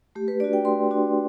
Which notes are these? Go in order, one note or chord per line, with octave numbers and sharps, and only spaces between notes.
A3 G4
B4
D4 F#4 D5
G5
A3 C6
D4 F#4